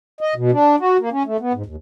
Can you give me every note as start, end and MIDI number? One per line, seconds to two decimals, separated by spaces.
0.21 0.34 75
0.36 0.51 47
0.52 0.76 62
0.80 0.97 66
1.00 1.09 58
1.12 1.23 61
1.26 1.37 57
1.40 1.53 59
1.53 1.63 44
1.66 1.76 39